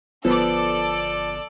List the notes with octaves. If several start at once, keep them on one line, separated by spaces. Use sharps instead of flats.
G1 F3 B3 A4 D5